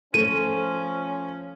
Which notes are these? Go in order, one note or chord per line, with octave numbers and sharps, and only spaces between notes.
F3 A3 C#4 D#7